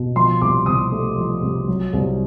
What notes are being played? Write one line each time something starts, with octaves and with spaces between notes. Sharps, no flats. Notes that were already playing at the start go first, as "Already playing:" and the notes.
Already playing: B2
F3 C6
C2 D6
C3 D#6
A3
F3
C2
F#3
C2